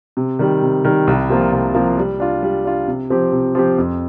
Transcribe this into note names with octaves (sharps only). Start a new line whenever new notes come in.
C3
D#3 G3
C3
D#3 G3
C2
C3 F3 A#3 F4
C2
C3 F3 A#3 F4
G3
D4 F4
G3
D4 F4
C3
F3 C4 G4
C3
F3 C4 G4
F2